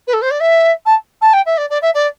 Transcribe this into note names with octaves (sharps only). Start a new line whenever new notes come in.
B4
A4
C5
D5
E5
A5
A5
G5
E5
D5
D5
E5
D5